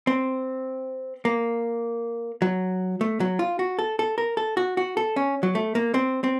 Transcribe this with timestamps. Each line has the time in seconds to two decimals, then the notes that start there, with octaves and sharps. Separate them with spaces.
0.07 C4
1.25 A#3
2.42 F#3
3.01 A3
3.20 F#3
3.39 F4
3.59 F#4
3.79 A4
3.99 A4
4.18 A#4
4.37 A4
4.57 F#4
4.77 F#4
4.97 A4
5.16 C#4
5.43 F#3
5.55 A3
5.75 A#3
5.94 C4
6.24 C4